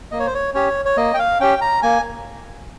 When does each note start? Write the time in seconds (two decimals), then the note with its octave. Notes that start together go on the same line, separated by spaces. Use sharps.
0.11 A#3 D#5
0.19 C#5
0.27 C5
0.34 C#5
0.54 C#4 G4 C#5
0.85 C#5
0.97 A#3 D#5
1.14 G5
1.19 F5
1.40 C#4 G4 G5
1.61 A#5
1.82 A#3 G#5